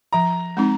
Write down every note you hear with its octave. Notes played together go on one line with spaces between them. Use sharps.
F3 A#5
G#3 C4 D#4